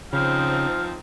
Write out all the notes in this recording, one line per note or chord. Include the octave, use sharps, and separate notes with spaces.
C#3 F3 C4 D#4 F6